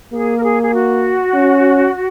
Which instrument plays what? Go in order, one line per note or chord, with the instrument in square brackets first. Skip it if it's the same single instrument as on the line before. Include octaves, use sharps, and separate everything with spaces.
[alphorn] A#3 [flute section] G#4
[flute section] A#4
G#4
G#4
F#4
[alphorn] C#4